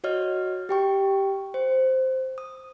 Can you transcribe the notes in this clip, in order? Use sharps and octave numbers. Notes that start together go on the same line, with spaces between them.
F#4 C#5 D#5 F6
G4 G5 C#6
C5
D#6